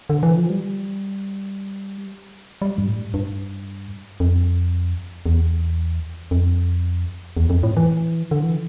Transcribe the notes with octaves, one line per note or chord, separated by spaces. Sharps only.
D3
E3
F3
G3
G3
G2
A2
G2
F2
E2
F2
E2
F2
A2
E3
D3
E3